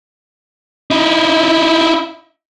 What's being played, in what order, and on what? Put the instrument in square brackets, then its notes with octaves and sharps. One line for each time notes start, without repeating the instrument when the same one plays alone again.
[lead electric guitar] D#4 E4